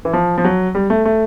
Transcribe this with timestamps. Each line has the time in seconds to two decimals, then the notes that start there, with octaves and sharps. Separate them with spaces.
0.05 E3
0.13 F3
0.38 F3
0.45 F#3
0.75 G3
0.90 A3
1.05 A3